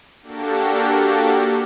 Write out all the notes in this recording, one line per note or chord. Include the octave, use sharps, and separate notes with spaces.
A#3 D4 F#4 G4 A4